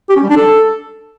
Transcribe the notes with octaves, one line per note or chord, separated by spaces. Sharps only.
G4
C#4
G3
D4
A4